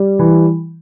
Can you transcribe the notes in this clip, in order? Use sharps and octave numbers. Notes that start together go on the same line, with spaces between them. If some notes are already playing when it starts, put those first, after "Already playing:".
Already playing: G3
E3